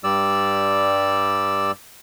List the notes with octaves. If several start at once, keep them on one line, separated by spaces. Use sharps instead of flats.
G2 G3 D5 E6